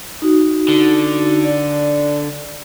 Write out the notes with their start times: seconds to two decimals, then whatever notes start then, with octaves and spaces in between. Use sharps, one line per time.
0.22 D#4 F#4
0.68 D3
1.44 D5